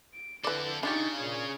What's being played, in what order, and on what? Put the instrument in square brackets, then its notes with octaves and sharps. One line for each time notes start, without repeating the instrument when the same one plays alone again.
[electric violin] D7
[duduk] D3 [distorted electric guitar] C4 A4 [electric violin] E4 [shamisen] B4 D5
[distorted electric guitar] C#3 [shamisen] D4 F4 G4 [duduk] D#4 [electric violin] C#6 A6
[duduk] A#2 [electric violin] G#4 C#5